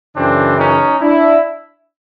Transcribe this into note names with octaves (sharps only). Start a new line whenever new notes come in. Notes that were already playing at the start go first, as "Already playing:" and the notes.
F#2 C#3 E3 C4 D4
C#4 D#4
D4 E4